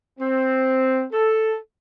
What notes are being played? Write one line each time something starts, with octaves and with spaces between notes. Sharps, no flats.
C4
A4